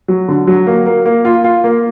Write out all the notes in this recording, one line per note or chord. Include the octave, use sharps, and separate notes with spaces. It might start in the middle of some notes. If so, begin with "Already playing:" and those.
F#3
D3
F#3
A#3
A#3
A#3
F4
F4
A#3